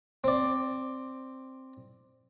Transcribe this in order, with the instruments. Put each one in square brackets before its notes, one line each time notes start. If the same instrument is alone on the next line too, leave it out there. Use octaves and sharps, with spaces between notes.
[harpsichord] C4 D5